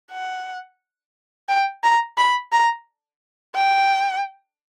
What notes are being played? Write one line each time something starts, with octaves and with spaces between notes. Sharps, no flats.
F#5
G5
A#5
B5
A#5
G5